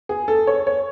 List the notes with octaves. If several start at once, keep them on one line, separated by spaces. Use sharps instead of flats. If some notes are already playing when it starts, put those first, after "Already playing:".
G#4
A4
C#5
C#5